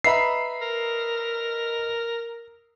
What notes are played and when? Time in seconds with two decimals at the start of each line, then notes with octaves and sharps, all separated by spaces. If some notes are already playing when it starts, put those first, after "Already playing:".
0.04 B4 D#5 E5 A#5 B5 C7
0.61 A#4